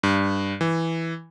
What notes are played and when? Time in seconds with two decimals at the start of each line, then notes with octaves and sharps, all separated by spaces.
0.03 G2
0.61 E3